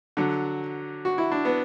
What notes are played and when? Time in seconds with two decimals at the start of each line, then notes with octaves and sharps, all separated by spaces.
0.17 D3 F#3
1.05 F#4
1.18 E4
1.32 D4
1.45 B3